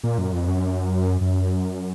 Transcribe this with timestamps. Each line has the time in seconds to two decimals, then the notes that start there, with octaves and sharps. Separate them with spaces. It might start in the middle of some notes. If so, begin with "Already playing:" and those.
0.04 A#2
0.18 F#2
0.33 F2
0.48 F#2
1.21 F#2